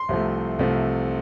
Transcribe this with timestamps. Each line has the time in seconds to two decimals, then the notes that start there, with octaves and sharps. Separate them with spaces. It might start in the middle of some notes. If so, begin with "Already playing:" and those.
Already playing: C6
0.09 C2 C3 F3 A3
0.59 C2 C3 F3 A3